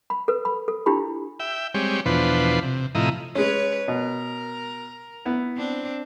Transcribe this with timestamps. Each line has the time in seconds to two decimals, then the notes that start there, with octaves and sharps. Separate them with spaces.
0.10 B5
0.28 A4 B4
0.45 B5
0.68 A4
0.86 D4 E4 F4 G4 B5
1.40 E5 G5
1.74 G3 G#3 C4 G4 C#5
2.06 E2 B2 F3 D4 B4 C5
2.62 C3
2.95 A2 C3 F3 E4 D#5 A#5
3.35 G#3 C#4 B4 C#5
3.88 B2 A#4
5.26 B3 E4
5.57 C4 D4